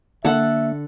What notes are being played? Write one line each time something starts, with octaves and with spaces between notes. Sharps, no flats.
D3 A#3 A4 E5 F#5